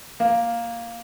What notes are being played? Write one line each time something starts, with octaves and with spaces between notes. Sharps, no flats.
A#3